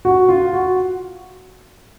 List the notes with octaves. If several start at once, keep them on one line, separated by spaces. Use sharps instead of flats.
F#4
F4
F#4